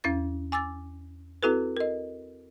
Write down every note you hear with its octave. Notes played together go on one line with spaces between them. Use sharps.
E2 C#4 E4 A6
G#5 D6 E6 A6
C4 E4 F#4 A4 B4
A#4 D#5